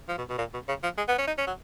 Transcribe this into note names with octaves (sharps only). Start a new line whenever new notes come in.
F3
B2
B2
A#2
B2
C#3
F3
G#3
B3
C#4
D#4
C#4
F#3